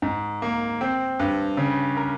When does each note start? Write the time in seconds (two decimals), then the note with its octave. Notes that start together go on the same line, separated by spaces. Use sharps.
0.02 G#2
0.42 A#3
0.81 C4
1.19 G2
1.57 C#3
1.97 A#4